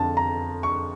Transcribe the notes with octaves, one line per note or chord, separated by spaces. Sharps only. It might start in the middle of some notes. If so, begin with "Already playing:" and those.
Already playing: F2 D3 A5
A#5
C#6